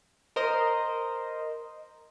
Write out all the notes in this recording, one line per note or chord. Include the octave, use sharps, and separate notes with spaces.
A#4 C5 D#5